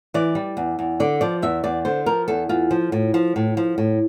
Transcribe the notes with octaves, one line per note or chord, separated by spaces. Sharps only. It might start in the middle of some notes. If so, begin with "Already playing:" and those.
E3 D5
G3
E2
E2
D3 D5
F3 D5
E2 E5
E2 D5
D3 C5
F3 A#4
E2 A4
E2 F4
F3
A2
F3
A2
F3
A2